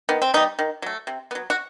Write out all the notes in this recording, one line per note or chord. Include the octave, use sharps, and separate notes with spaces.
D#3 B3
C4
G3 B3 D#4
D#3
F#3 A3
C3
F#3 B3
F#4